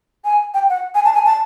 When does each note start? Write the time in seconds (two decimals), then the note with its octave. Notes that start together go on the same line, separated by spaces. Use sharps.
0.25 G#5
0.54 G5
0.69 F#5
0.95 G#5
1.05 A5
1.14 G#5
1.26 A5